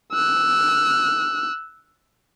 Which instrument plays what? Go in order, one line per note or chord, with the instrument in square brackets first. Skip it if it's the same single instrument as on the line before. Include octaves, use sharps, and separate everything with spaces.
[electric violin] E6 F#6